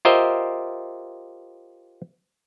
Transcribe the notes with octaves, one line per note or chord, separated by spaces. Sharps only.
F4 G4 A#4 C5 D#5 E5